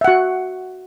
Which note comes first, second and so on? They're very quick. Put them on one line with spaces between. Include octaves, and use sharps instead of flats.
E5 F#5 F#4